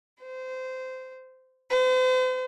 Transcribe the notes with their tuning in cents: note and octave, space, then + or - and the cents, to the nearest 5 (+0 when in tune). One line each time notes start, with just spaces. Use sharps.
C5 -20
C5 -40